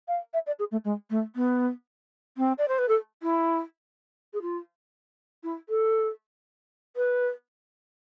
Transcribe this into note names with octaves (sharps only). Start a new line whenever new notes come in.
F5
E5
D5
G#4
A3
G#3
A3
B3
C4
D5
C5
B4
A4
E4
G#4
F4
E4
A4
B4